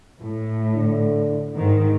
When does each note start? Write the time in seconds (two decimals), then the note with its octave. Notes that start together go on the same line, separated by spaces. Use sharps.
0.21 A2
0.75 D3
1.57 G#2 D#3